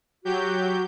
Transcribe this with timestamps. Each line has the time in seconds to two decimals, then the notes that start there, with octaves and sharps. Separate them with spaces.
0.25 F#3 F#4 G4 G6